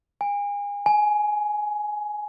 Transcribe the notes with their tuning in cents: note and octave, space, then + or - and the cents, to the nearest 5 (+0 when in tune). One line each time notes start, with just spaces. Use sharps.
G#5 -35
G#5 +15